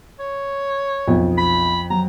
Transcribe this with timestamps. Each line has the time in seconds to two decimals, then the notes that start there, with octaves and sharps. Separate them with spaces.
0.20 C#5
1.07 B1 F2
1.38 B5
1.90 F#3 A#5